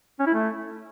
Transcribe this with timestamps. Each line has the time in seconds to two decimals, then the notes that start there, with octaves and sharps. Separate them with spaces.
0.19 C#4
0.27 E4
0.34 A3